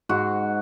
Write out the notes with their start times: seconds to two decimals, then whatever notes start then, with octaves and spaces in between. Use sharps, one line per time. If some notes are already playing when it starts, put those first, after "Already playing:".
0.09 G#2 F#4